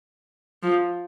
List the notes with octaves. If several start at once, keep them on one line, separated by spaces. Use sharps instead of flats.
F3